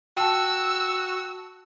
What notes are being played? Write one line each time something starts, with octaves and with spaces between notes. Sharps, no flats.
F#4 G5 A5 E6